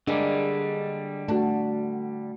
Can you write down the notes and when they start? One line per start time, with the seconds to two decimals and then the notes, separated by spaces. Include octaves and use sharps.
0.07 D3 G3 G#3 A#3 D4
1.28 A3 D4 F#4